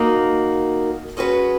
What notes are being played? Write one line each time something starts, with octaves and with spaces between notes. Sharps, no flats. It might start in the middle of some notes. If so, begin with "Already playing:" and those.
Already playing: A#3 D#4 F#4 A#4
G#3 C#4 F#4 B4